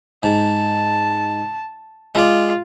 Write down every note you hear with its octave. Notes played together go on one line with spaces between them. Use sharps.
G#2 A5
G#3 F4 D5